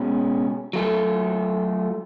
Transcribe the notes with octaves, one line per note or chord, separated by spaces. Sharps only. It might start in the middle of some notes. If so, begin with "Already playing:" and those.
Already playing: B2 G#3 C#4 G#4
F#3 A3 F4 A4